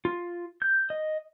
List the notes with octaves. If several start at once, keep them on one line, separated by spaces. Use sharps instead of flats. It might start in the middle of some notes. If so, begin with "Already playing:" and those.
F4
G6
D#5